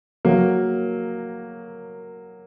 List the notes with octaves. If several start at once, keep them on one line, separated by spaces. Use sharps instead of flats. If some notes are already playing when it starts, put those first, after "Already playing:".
F#3 A#3